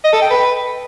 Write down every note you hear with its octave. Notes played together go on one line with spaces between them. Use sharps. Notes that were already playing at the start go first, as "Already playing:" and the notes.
D#5
A4
G5
B4